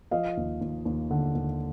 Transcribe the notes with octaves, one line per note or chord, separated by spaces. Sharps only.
F3 D#5 F5
D#2
D#2
D#2
D3
D#2